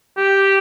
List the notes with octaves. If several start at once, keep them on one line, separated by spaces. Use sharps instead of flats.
G4